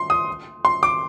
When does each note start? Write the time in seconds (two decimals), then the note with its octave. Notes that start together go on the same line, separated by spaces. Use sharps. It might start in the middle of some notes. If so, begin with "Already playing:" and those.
Already playing: C6
0.10 D#6
0.65 C6
0.83 D6